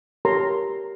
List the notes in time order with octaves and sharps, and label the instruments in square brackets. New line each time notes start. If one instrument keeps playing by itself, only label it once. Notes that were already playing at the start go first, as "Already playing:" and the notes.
[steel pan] G4 A4 A#4 C#5 A#5 C6